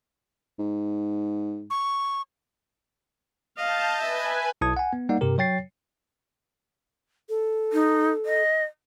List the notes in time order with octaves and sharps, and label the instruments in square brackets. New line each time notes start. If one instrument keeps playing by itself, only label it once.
[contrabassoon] G#2
[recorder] C#6
[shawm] D#5 [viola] F5 [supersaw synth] A5 G6
[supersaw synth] B4 G#5 [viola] E5
[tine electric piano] B1 E4 A5 D#6 G#6
F#5 G#5
B3
G3 A#3 D#4 D5 F#5
G2 C3 G4 A#4
F#3 C#5 G5 A6 C7
[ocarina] A4
[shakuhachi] D#4
D#5